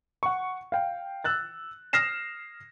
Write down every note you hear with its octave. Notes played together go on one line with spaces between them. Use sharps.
F#5 C#6
F5 G5
E6 F#6 A6
D#6 F6 A#6 C7 E7